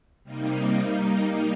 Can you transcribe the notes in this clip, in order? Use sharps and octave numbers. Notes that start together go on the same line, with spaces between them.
C3 G3 A#3 D#4
G3 A#3 D#4